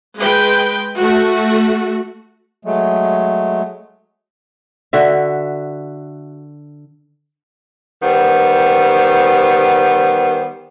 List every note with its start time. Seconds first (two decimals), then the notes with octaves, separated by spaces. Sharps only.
0.17 G#3 B4 G5
0.97 A3 F#4
2.65 F#3 G#3 A3
4.93 D3 F#4 E5
8.02 D#3 G3 B3 C5